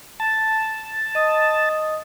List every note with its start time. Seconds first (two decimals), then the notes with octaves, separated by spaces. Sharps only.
0.20 A5
1.15 D#5 D#6